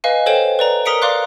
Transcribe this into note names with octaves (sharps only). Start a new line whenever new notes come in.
B4 D#5 F5 G#5
A4 C5 C#5 G5 E7
B4 D5 A#5
A#4 A#5 D#6 B6 C#7 D7
D5 F5 C6 D6 F#6